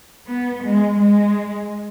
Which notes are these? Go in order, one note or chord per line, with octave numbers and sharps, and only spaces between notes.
B3
G#3
G#3